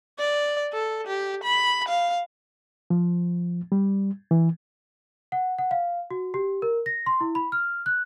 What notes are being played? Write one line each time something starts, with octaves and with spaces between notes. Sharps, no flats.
D5
A4
G4
B5
F5
F3
G3
E3
F#5
F#5
F5
F#4
G4
A#4
A#6
C6
E4
B5
F6
F#6